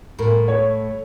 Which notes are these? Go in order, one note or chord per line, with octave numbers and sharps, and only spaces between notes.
A2 A#4
C#5